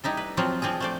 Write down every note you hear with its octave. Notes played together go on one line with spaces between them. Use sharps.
G3 D#4 E4 A4
B4
F3 F#3 C4 F4
F3 C4 D4 G#4
A3 C5 D5